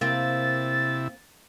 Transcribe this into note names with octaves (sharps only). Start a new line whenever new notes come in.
C3 A#3 C4 E4 A6